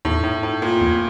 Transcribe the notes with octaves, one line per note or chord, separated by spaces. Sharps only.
E2 A2
A2
A2
A#2
F2